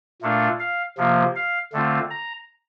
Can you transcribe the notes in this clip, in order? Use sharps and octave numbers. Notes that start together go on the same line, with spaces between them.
A#2 A3 D4 F4
F5
C3 F3 A#3 F4
F5
D3 A3 C4 F4
A#5